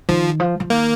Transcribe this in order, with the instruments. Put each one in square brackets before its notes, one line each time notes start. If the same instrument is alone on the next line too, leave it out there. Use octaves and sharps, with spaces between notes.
[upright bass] D#3 [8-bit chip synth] F3
[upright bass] F3
F3
[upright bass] D#3 [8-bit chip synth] A#3